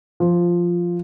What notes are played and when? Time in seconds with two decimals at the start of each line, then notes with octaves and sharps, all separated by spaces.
0.20 F3